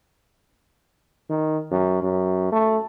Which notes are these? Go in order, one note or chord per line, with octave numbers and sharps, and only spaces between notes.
D#3
F#2
F#2
A3